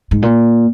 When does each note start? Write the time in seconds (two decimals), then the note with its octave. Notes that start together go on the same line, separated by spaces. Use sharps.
0.11 G#2
0.22 A#2